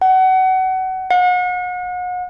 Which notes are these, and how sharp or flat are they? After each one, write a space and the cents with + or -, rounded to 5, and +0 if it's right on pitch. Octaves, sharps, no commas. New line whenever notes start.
F#5 +25
F#5 -40